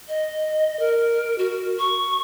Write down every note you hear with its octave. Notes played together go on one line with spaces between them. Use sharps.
D#5
A#4
F#4
C#6